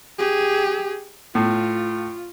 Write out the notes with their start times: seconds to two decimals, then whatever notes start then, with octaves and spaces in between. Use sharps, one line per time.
0.19 G4 G#4
1.35 A2 F4